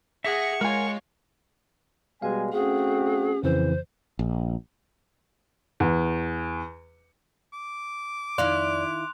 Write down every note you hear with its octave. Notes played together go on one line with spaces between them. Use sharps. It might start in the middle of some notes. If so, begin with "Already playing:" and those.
G#4 E5 F#5 C#6 A#6
G#3 F4 A#4 C#5 F#5 G#5
B2 G3 G#3 F5 G#5
A3 C4 C#4 F#4 G#4
F2 C#3 E3 C5
A#1
E2
D6
F2 D#3 E4 D5 F5 C6 F#6 F7